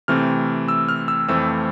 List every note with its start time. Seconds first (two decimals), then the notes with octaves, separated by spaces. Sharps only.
0.08 C3 E3 A3 C4 F6
0.68 E6
0.88 F6
1.08 E6
1.28 F2 E3 A3 C4 E6